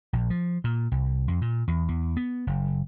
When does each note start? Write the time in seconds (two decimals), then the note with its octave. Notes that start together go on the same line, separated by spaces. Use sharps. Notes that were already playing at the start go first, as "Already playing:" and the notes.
0.13 A#1
0.30 F3
0.64 A#2
0.91 C2
1.28 F2
1.41 A#2
1.68 E2
1.88 E2
2.17 B3
2.47 F#1